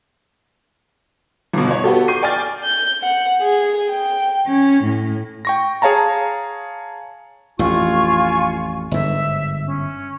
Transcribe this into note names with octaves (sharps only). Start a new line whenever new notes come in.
G1 B2
C#5
B3 F#4 G4 A4
C#6 D6 G6 C7 D#7
D5 G5 G#5 D6 F6 A6
G6
F#5
G#4
G5
C#4
A2
G5 C#6 A#6
G#4 C#5 F5 A5 A#5
A1 F2 A2 F4 G#5 C#6
G1 G#2 E5
C#4